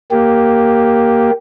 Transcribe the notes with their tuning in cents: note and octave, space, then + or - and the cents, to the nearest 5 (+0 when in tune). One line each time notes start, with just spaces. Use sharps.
A#3 +0 G4 +0